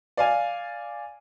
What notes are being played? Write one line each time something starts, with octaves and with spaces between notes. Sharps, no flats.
D5 F5 G#5